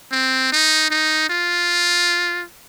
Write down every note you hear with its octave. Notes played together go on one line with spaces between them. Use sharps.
C4
D#4
D#4
F4